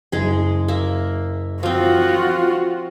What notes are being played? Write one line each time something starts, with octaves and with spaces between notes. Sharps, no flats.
F#1 G#3 G#4
A#3 E5
F3 C4 F4 F#4